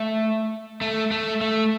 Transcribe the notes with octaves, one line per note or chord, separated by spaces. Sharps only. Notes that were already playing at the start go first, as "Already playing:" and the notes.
Already playing: A3
A3
A3
A3